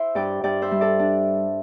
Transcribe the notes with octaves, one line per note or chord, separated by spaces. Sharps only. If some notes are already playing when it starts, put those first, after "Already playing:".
Already playing: E4 C5 E5
G2 D5 G5
G2 D5 G5
C5 E5
G3
A4 D5
D4